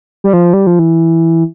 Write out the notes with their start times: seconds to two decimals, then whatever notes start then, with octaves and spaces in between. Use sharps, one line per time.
0.24 G3
0.33 F3
0.53 G3
0.67 F3
0.79 E3